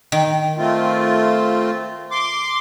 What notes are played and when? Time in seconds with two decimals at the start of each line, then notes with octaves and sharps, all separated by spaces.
0.12 D#3
0.58 A3 C4 F4
2.11 C6 D6